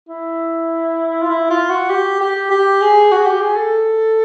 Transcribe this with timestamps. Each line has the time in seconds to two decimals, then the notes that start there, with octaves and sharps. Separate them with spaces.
0.09 E4
1.22 F4
1.29 E4
1.50 F4
1.70 F#4
1.90 G4
2.21 G4
2.51 G4
2.81 G#4
3.12 F#4
3.26 G4
3.41 G#4
3.56 A4